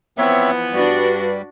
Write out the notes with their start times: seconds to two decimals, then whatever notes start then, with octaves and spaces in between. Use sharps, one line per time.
0.18 E3 F3 B3 C4 C#5 E5
0.73 G2 G3 D4 F#4 B4